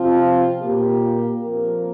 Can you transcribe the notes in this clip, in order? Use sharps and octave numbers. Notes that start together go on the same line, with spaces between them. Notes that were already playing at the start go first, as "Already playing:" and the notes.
Already playing: C3 F3 C4 F4
A#2 A#3 G4
F2 F3 A#3 A#4